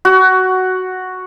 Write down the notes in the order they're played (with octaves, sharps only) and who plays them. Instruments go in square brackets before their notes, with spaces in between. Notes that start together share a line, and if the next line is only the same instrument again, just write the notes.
[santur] F#4